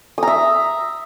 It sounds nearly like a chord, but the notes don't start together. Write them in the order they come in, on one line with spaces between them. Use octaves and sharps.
D#6 A#5 E5